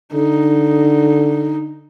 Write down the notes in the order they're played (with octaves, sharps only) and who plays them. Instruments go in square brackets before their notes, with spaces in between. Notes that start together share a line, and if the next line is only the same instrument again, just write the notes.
[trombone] D3 [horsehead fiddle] D#4